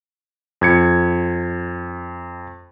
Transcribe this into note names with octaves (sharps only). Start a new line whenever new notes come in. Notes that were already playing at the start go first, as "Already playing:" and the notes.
F2 G#6 C#7